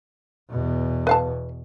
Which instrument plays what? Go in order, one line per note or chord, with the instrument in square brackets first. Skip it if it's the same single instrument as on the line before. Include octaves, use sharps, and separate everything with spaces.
[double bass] E2 B2
[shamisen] B4 F5 A5